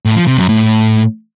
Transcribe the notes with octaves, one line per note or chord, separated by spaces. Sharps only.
A2
F3
C3
F#2
A2